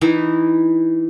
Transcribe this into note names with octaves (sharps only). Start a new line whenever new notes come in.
E3 D#4 E4